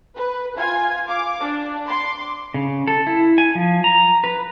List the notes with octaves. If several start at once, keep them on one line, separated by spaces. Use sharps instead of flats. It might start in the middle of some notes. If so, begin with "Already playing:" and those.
B4
F4 G#5 G#6
F5 D6
D4
C6 D6
C#3
A4
E4
G#5
F3
A#5
B4